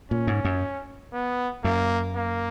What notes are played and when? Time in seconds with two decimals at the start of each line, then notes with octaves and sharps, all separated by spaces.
0.11 A#2 C#4
0.27 G#2
0.45 F#2
1.13 B3
1.64 F#2 A#3
2.16 A#3